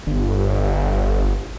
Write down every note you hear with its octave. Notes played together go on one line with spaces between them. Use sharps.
G1